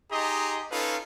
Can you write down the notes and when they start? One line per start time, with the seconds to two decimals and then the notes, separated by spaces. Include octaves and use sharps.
0.11 D#4 G4 G#4 D#5 A#5 C6
0.71 C#4 D#4 F4 A4 B4 F5